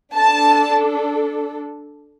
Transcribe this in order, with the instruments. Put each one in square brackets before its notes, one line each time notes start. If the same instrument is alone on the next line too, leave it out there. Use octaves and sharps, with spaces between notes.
[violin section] D4 A4 A5